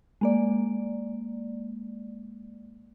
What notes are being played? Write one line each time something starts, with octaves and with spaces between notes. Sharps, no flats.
G#3 A#3 D5